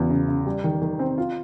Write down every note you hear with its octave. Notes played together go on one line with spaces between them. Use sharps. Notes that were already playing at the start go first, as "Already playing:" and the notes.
Already playing: E2 C#3 F#3
C#3
C#3
G3
D#3
D#3
C4
F4